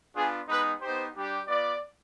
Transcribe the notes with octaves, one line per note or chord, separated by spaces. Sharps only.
B3 D4 F4 G#4
G#3 B3 D#4 B4
B3 D#4 G4 C5
G3 D4 G4
B3 F4 D5